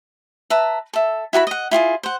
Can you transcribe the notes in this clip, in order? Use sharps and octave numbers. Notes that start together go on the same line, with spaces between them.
B4 E5 A5 A#5
A4 E5
E4 F#4 A5 B5
D#5 F#5
E4 F4 G4 G#4
C5 F#5